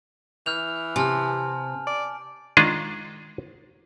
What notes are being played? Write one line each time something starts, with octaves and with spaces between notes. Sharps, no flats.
E3 F6 G6 F7
C3 G#5 A5 F6
D5
D#3 G#3 D4 F4 G#4 D#5